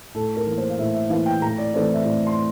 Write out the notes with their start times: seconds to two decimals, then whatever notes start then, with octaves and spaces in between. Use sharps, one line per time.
0.15 A2 A4
0.36 A#4
0.46 E3 A#3
0.58 C5
0.70 F5
0.79 A2 E5
0.94 E5
1.10 E3 A#3 F5
1.26 G5
1.41 A2 A#5
1.58 D5
1.74 E3 A3 C4 D5
1.94 E5
2.05 A2 D5
2.27 C6